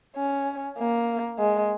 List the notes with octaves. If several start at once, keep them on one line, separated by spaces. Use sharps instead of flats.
C#4
A#3
G#3